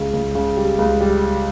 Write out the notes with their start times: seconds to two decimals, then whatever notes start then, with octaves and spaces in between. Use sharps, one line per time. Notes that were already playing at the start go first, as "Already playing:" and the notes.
Already playing: C#2 C#3
0.13 C#2
0.35 C#3
0.57 G3
0.79 C#2
1.00 G3